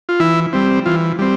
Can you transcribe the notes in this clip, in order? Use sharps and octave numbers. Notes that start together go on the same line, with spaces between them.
F4
E3 E4
G3 C4
E3 F4
G3 C4